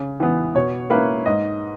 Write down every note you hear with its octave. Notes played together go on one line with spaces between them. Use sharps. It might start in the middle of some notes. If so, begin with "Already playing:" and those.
Already playing: C#3
E3 B3
B2 C#5
A#3 C#4 E4 B4
G#2 D#5